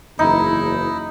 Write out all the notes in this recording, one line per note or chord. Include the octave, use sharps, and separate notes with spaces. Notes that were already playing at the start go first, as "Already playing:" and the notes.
F#1 E2 D#4 E4